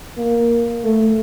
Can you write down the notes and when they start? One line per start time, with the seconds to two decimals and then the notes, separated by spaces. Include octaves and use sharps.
0.18 A#3
0.84 A3